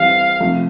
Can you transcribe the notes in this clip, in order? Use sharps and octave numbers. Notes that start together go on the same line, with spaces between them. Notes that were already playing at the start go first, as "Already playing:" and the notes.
Already playing: E3 G3 C4 F5
C3 F3 A3